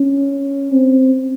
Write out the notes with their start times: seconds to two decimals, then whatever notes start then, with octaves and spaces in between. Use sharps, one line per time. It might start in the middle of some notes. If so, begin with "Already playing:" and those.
Already playing: C#4
0.72 C4